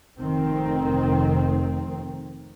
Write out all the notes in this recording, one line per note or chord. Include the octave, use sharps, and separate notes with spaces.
F1 D#3 C4